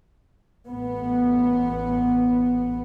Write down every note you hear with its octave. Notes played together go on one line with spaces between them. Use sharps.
A1 B3